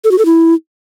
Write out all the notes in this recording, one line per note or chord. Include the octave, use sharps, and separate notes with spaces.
A4
F#4
A4
E4